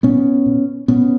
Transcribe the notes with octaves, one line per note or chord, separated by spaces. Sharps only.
A#2 B3 C#4
A#2
A#2 B3 C#4